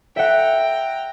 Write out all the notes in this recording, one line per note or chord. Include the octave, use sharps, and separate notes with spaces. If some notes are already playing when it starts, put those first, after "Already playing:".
E5 F#5 G5 A#5